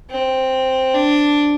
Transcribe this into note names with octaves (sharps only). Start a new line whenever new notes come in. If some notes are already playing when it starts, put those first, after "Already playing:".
C4
D4